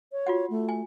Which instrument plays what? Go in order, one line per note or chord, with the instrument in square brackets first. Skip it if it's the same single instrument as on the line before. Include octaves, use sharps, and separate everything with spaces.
[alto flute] C#5
[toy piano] F4 F#4 F#5
[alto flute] A3
[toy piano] G#5